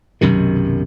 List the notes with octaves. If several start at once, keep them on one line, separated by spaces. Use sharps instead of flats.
B1 F#2 C3 D#3